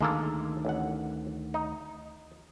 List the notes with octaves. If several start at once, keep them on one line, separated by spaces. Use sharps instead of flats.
D2 D#3 G#3 A#3 A4
A1 F#5
D#4